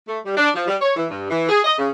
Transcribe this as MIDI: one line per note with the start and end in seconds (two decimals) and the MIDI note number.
0.08 0.19 57
0.25 0.35 55
0.36 0.49 62
0.55 0.67 53
0.68 0.76 55
0.82 0.94 73
0.96 1.06 52
1.10 1.29 43
1.30 1.48 52
1.49 1.60 68
1.65 1.78 75
1.78 1.89 49